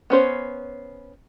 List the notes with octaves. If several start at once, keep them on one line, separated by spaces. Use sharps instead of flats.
B3 C#4 C5 C#5